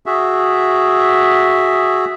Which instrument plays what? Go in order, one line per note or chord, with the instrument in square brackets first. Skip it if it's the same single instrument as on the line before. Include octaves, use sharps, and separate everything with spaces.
[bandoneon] F#4 G#4 E5